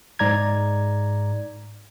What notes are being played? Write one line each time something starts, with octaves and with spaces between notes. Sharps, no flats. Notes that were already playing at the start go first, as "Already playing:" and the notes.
G#2 D5 A#5 G#6